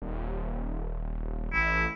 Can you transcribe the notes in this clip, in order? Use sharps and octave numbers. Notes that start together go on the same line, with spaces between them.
D#1
A1 E4